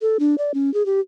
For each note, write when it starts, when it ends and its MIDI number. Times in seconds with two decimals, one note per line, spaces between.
0.02 0.17 69
0.20 0.35 62
0.38 0.52 74
0.54 0.73 61
0.74 0.85 68
0.86 1.00 67